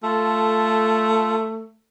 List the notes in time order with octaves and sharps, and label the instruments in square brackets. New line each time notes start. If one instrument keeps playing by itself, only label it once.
[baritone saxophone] A3 [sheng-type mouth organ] F4 A4 A5